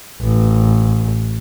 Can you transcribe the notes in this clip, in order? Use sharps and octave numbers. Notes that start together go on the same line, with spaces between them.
A1